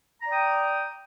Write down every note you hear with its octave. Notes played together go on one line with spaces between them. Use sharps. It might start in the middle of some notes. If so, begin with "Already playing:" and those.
D5 G5 A#5 D#6